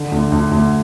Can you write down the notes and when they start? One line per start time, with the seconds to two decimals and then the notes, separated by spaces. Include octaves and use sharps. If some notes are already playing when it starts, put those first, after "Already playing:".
Already playing: D3
0.12 D2
0.32 D2
0.51 D2